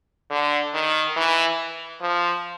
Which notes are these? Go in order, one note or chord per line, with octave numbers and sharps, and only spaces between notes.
D3
D#3
E3
F3